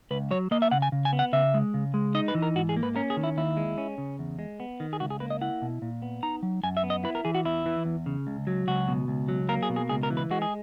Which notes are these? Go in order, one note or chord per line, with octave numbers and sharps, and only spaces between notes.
C#2 B4
F#3 C#5
A#3 D#5
E5
C#3 F#5
G#5
C#3
G#5
B3
F#5
C#3 E5
G#3
C#3
G#3
D#4 D#5
B4
E3
A#4
G#2 F#4
G#4
A#3
B4
C#4 A#4
G#4
D#3
E4
D#2 E4
G#3
C#4
C#3
E2
G#3
B3
D#3
G#4
C#2 F#4
G#4
A#3 B4
D#5
E4 F#5
B2
A#2
B3
D#4 A#5
F#3
F#2 G#5
E5
B3
D#5
E4 B4
A#4
E3 G#4
F#4
E2 E4
E3
E2
C#3
C#2
F#3
C#2 F#4
B2
C#2
F#3
A#3 A#4
G#4
B2
G#4
C#2 G#4
A#4
E3
B4
G#3 F#4
G#4